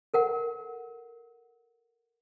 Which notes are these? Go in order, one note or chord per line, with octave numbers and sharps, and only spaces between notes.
A4 A#4 F#5